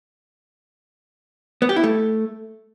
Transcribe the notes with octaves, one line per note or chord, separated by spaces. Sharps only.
B3
G4
E4
A3